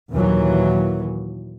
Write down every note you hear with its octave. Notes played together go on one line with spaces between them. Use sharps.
D#2 A#2 E3 F#3